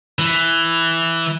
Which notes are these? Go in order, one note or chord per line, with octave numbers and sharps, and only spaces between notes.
E3